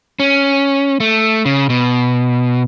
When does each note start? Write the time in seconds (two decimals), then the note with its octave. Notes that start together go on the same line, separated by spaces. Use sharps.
0.20 C#4
1.00 A3
1.45 C#3
1.70 B2